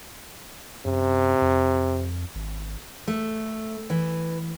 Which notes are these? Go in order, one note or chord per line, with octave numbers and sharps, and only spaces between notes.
F#2 C3
F2
G#1
A3
E3